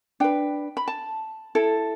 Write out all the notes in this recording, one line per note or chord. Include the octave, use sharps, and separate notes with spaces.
D4 B4 G5
B5
A5
E4 A4